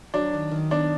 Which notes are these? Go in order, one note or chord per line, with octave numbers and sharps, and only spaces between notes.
F#3 D4
D#3
D#3
B3 D4